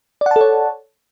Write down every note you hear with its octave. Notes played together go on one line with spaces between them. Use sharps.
A4 C#5 D5 F#5 A5